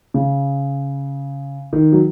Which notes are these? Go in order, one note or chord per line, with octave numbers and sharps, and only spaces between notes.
C#3
D#3
F#3